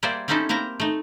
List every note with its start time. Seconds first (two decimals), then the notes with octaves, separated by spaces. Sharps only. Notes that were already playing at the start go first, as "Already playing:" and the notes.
0.03 G3 A#3 G#4 C5 D5 E5
0.28 G3 C4 C#4 D#4 E4 A4
0.49 A#3 C4 E4 A#4 A#5
0.80 A3 D#4